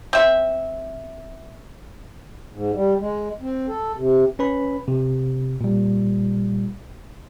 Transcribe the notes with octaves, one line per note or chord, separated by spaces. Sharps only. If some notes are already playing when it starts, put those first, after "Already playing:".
C4 E5
G#2
G3
G#3
C4
A4
C3
C#4 B4 B5
C3
A#2 G3